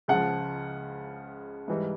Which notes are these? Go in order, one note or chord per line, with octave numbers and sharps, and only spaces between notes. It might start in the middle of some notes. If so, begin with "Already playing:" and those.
C#2 C#3 F3 F#5
G#2 E3 G3